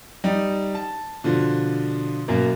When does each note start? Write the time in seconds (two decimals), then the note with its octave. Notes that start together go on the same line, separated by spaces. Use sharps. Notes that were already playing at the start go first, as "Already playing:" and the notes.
0.24 G3 D#4
0.75 A5
1.24 B2 D3 F3
2.28 F#2 B2 A#3